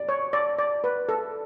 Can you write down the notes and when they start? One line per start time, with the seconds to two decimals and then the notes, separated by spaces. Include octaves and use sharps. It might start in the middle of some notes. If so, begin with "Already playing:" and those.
Already playing: D5
0.09 C#5
0.33 D5
0.58 D5
0.84 B4
1.09 A4